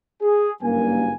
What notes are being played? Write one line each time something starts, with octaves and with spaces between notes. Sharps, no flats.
G#4
F#1 G2 A#3 G#5